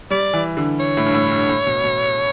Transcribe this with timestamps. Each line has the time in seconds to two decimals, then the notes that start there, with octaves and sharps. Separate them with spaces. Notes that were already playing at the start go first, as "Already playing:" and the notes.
0.10 G3 D5
0.34 E3
0.57 D3
0.80 C#5
0.97 A2
1.06 G2
1.15 A2
1.32 G2
1.49 A2
1.66 B2
1.84 B2